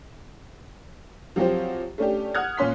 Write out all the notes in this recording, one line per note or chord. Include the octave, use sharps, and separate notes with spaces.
F3 F#3 C4 G4 C5
A3 C#4 D4 G4
F#5 D#6 F6 F#6 G#6
A#2 A#3 C#4 C6 B6